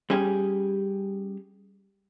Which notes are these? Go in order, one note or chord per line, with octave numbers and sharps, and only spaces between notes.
G3 C#4 G4 G#4